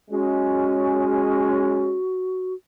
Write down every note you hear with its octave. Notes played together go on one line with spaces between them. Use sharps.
G#3 C#4 F#4